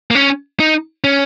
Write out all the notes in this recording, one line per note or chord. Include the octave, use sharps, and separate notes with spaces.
A#3
C#4
D#4
C#4